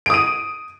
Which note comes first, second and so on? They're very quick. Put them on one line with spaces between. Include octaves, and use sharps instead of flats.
D7 D#6 D#7